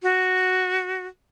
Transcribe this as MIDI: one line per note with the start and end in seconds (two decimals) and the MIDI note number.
0.03 1.06 66